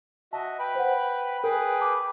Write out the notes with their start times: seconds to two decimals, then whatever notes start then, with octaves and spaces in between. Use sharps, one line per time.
0.33 F#4 D#5 E5 A5
0.59 B4 G5 B5
0.75 C5 F#5
1.44 G#4 A#4 B4 G5
1.80 A5 D6